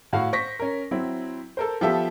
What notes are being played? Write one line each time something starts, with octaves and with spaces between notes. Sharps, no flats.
A2 F#4 F5
C5 C#6 A#6 B6
C#4 A#4
F#3 C4 E4
A4 A#4 C5
F3 B3 F4 G4 A4 E5